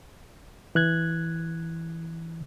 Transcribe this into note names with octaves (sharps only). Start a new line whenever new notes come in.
E3 F#6 G#6